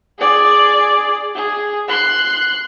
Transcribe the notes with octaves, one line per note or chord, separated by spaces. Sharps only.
G#4 D5
G#4
C6 F#6